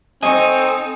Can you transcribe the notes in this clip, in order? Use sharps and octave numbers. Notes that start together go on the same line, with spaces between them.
C4 D#4 A4 D#5 G#5 C#6